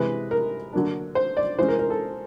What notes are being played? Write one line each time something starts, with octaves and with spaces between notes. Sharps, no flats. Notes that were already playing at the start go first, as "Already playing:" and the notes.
Already playing: C3 E3 G#3 B4
A#4
D3 F#3 A#3 D4
C5
D5
E3 G#3 C#4 C5
A#4
A#4
A4